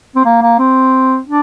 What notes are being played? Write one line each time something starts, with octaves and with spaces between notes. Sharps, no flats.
C4
A#3
A#3
C4
D4